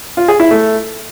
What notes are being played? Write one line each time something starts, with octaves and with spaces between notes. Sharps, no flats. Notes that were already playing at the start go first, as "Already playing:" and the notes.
F4
G#4
E4
A3